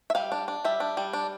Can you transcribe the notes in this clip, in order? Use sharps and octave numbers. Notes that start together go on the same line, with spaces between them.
E5
G3 F5
D4
D4
G3 E5
D4
G3
D4